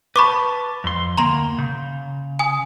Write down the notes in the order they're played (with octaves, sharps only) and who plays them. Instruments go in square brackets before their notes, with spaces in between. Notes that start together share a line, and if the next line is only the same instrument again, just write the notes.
[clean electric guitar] B4 A5 [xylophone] B5 C#6 D6
[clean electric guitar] F2 C6
[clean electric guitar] D2 A#3 [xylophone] A#5 C6 F7
[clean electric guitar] C#3
[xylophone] G#5 D#6